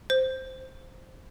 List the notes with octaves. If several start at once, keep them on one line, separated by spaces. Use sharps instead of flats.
C5